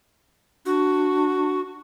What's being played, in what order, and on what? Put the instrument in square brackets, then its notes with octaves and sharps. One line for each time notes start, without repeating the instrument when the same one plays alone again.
[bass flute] D4 [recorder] F#4